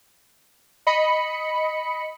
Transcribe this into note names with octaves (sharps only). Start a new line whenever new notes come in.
D#5 B5 C#7